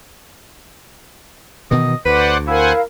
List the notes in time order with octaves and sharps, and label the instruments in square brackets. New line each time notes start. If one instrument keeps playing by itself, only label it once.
[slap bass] B2 D#3 E3 [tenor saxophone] D#5
[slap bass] D2 [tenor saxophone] B4 [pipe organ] C5 D5 F#5
[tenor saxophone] E4 [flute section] A#4 F5 [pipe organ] C5 F#5 G#5